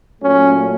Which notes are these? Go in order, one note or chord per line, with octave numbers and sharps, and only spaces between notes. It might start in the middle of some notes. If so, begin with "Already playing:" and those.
A#2 F#3 A3 C#4